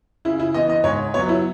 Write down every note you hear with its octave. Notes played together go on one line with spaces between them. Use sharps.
C#3 E4
E4
E3 B3 D#5
D#5
G#2 C#5
F#3 B3 C#5
E4